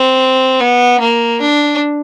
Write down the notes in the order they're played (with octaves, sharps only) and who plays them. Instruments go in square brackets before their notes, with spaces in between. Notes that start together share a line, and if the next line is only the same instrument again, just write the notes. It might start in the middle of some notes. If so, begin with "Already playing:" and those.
Already playing: [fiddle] C4
B3
A#3
D4